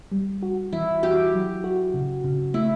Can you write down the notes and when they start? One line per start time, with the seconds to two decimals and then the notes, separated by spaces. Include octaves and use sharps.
0.12 G3
0.42 F#4
0.73 E3 E4
1.02 F#4 G4
1.34 F#3
1.64 F#4
1.94 C#3
2.24 C#3
2.54 A3 E4